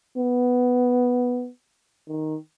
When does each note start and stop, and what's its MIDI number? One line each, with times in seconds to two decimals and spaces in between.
0.18 1.49 59
2.08 2.36 51